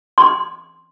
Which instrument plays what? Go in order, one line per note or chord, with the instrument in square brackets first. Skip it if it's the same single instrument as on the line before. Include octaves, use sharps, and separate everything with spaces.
[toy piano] C6